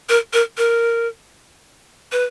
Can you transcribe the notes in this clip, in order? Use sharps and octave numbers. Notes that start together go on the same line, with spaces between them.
A#4
A#4
A#4
B4